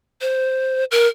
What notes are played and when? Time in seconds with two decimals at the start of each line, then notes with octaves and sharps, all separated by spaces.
0.21 C5
0.91 A#4